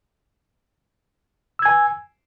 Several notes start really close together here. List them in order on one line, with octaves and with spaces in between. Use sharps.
E6 G#6 G#5